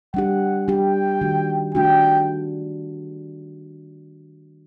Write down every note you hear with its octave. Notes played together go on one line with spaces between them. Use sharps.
G3 D4 G4 F#5
G3 D4 G4 G5
D#3 A3 D4 F#4
D#3 A3 D4 F#4 G5